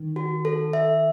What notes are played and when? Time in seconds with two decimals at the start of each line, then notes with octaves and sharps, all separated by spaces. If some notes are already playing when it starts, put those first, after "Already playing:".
Already playing: D#3
0.16 F#4
0.45 A4
0.73 E5